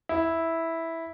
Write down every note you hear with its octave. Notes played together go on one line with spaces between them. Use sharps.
E4